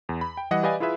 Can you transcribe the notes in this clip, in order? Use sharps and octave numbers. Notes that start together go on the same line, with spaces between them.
E2
B5
G5
E3 G3 D#5 F#5
G4 B4 D5 D#5 F5 G#5
E4 F4 G#4 B4 E5